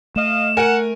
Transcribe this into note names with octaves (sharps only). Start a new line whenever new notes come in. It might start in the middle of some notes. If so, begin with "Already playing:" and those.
A3 D#5 F5 E7
A#4 F#5 G#5